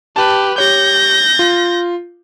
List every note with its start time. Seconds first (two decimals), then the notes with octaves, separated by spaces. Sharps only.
0.16 G4 B4 A5
0.58 G4 C#5 G6 A#6
1.39 F4